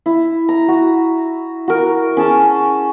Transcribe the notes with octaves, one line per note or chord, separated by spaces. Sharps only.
E4
A#5
F#4
F#4 A#4
C#4 G#4 A5 C#6